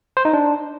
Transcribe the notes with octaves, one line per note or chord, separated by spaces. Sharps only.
C5
D#4
D4